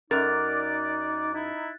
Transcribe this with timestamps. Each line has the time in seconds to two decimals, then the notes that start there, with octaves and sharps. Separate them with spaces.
0.11 F#2 D#4 A#4 D5 F#6 A6
1.34 D#4 E4